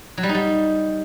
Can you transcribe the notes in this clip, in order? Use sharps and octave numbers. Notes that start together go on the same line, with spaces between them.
F#3
G3
D#4
G3